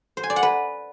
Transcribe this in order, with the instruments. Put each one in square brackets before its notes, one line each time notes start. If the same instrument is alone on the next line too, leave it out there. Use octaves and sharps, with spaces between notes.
[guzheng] C5
G#5
D5
F#5
B4